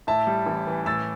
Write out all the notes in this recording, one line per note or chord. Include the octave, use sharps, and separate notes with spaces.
A2 E5 A5
G3
A1
E3
A2 E6 A6